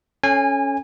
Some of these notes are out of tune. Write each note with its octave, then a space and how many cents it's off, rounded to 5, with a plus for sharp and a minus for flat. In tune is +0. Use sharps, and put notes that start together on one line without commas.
C#4 +0 A4 +0 G#5 -25